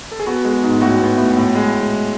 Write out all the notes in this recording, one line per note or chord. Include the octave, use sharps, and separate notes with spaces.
A4
G#4
B3 F#4
G#3
G#2
A2 F#4
B3
A2
A2
G#3